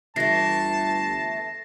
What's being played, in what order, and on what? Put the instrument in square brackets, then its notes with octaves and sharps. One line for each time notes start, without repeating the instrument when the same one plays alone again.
[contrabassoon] G1 [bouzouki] E3 A3 [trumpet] A5 [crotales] A#6 C7